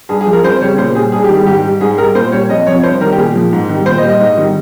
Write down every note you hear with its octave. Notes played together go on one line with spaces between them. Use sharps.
G2 G#4
G#4
F3
A#4
F2 C5
C#3 G3 C#5
A#2 C5
G3 G#4
G2 G#4
G4
D#3 G3
G#2 G4
G3
G#2 G#4
G3 A#4
A#2 C5
G3 C#5
F2 D#5
C3 F3 C#5
G2 C5
D#3 G3 A#4
G4
A#2 G#4
F3
G#2
D#3 G3
A#2 C5
D#5
G3
D#5
G#2
D#3 G3